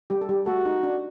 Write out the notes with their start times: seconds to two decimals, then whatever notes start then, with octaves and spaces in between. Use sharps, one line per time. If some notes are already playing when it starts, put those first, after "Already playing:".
0.10 G3 G4
0.21 A4
0.29 G3 G4
0.46 A3 F#4 A4
0.66 D#4
0.83 D4